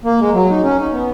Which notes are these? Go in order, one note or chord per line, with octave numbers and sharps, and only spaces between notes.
A#3
G#3
F#3
D#4
C#4
D#4
B3